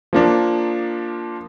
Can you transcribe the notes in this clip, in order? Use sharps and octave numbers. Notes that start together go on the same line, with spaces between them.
F3 A#3 D4